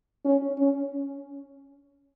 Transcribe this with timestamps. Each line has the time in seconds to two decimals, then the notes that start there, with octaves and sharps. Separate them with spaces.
0.25 C#4
0.59 C#4